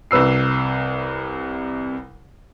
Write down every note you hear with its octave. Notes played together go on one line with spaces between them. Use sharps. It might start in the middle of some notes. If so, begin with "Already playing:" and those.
C2 C3 B4 E6 C7